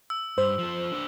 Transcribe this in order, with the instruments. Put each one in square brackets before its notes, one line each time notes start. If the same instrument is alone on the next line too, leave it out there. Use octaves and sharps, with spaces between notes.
[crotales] E6
[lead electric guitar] G2 [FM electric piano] C5
[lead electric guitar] F3 A4
D4 C5